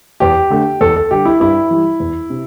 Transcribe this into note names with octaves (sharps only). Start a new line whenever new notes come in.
E2 G4
D3 A3
E2 A4
A4
D3 G3 G4
E4
G2 E4
E3 G3
E2
C3